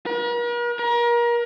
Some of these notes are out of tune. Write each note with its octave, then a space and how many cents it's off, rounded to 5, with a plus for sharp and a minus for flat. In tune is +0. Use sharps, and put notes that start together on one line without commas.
A#4 +45
A#4 +30